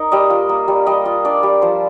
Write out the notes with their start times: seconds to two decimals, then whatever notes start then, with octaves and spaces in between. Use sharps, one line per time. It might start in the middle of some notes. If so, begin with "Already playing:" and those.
Already playing: D#4 A#4
0.12 G3 D#5
0.30 F4
0.49 A#3
0.68 G3
0.87 G3 D#5
1.05 F4
1.25 D4 D5
1.43 G3
1.62 F3 C5